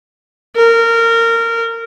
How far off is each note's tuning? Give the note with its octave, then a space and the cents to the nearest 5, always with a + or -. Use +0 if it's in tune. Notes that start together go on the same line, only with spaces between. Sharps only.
A#4 -20